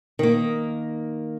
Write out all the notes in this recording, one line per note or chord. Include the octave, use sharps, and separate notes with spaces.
D#3 A#3